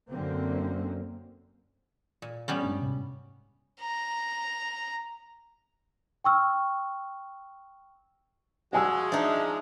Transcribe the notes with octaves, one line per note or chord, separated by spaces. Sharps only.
F#2 D3 A#3 C4
A#2
G3 B3 C#4
G2 G#3 D4
G#2 C3
A#5
G5 C#6 E6 F6
F3 G#3 F#4 F#5 G#5 E6
D4 D#4 E5